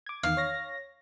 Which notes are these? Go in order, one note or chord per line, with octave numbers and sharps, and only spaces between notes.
D6 G#6
E2 D#3 F5
C#5 A#6